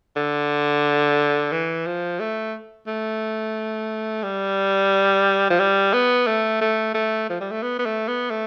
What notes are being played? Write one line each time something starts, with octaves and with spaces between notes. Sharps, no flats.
D3
E3
F3
A3
A3
G3
F3
G3
B3
A3
A3
A3
F3
G3
A3
B3
B3
A3
B3
A3